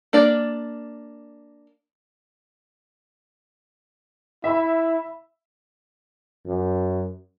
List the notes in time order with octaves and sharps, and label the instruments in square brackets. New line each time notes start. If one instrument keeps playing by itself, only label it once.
[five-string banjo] A#3 D4 D5
[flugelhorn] E4 [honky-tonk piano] E5 B5
[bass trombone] F#2